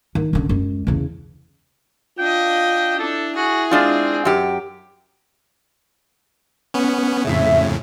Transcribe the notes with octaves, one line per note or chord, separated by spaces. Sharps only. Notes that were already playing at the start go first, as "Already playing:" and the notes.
D#3
F#2 D3
F#2 G#3
E2 C#3
D4 F4 D#5 G5
D4 E4 A4
F#4 G#4
G#3 C4 D4 F4
F#2 G4
B3 C#4
F2 A2 C#3 E5